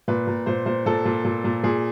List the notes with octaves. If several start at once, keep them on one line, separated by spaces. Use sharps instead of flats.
A#2 B4
A#2
A#2 C5
A#2 C5
A#2 A4
A#2
A#2
A#2
A#2 G#4